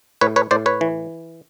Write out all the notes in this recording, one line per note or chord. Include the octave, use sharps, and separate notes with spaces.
A2 B4 C#5
B4 C#5
A2 C5 D5
B4 C#5
E3